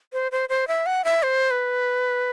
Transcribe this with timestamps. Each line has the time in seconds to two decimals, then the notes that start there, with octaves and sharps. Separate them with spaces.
0.13 C5
0.32 C5
0.49 C5
0.68 E5
0.86 F#5
1.05 E5
1.23 C5
1.51 B4